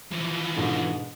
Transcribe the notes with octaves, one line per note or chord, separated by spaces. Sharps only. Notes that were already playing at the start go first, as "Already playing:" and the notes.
E3 F3
G#2 B2 D3